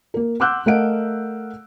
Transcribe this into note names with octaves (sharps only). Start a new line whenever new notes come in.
A#3 A#4
F#5 C6 D6 E6 F#6 G6
A3 A#4 D#5 F5 F#5 D7